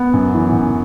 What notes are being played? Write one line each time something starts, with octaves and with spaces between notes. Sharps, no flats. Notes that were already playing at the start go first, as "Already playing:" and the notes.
Already playing: B3
F#2
E3
F#2